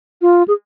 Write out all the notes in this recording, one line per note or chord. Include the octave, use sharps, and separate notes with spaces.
F4
G#4